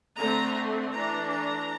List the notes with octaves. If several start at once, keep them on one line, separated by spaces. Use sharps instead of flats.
D3 A3 C4 A#5
E3 A3 D4 A#5
A#5